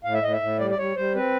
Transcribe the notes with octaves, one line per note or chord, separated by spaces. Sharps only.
A2 F5
E5
A2 D#5
E5
A2
G3 D5
D5
G3 C#5
G3 C5
C4 B4